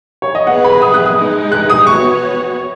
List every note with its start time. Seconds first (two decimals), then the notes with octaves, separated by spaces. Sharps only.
0.22 C#5
0.35 D#5
0.47 B3 G#4 B4 F#5
0.64 B5
0.82 D#6
0.94 F#6
1.06 D#6
1.17 G#3 D#4 B4
1.52 F#6
1.70 D#6
1.87 B3 F#4 C#5 C#6